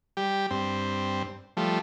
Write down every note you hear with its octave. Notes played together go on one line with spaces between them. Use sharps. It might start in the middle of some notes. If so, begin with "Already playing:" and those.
G3 G4
G2 C4
F3 G3 A3